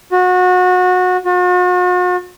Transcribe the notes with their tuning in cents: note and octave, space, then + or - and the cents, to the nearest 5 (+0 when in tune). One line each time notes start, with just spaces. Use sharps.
F#4 -25
F#4 -45